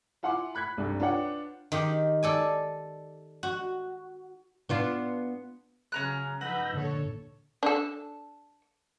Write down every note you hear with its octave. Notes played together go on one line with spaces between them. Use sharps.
E4 F4 F#5 G#5 C6 D6
B5 F#6 G#6 B6
C2 G2 A3
D4 F4 B4 C#5 F#5 G5
D#3 G4
A4 D5 G#5
F#4
B3 D4 F4
C#3 F#3 C#4 G#4 A#5 F#6
F3 D#4 B4 F#5 E6 G6 A#6
A#2 D3 A4 C#5
D4 A4